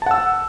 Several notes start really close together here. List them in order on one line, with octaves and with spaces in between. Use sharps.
A5 F#5 E6